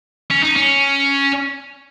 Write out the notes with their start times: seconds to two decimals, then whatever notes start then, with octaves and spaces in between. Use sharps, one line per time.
0.30 C#4
0.43 D#4
0.56 C#4